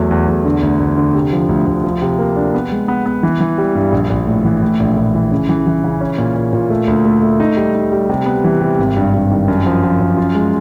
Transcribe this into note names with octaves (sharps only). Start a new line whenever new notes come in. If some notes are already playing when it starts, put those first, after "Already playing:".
Already playing: E2 F#3 A3
E2
E2
D3
D2
D2
D3
C3
F3
D2
D2
F3
C3
A#3
D4
B3
G#3
B3
B3
E3
E3
G3
G2
A#1
A#1
A2
E3
A2
A#1
A#1
E3
C#3
E3
E3
C#3
C#4
A#2
A#2
A#2
A3
D2
A3
A3
D#4
G3
D#4
G3
C3
B3
E3
C3
G#1
G2
G2
D#3
F#2
F3
F3
F#2
F4
G#3